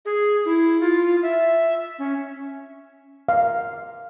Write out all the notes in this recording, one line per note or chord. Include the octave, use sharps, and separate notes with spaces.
G#4
E4
F4
E5
C#4
F5